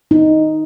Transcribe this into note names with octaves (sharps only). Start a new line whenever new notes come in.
D#4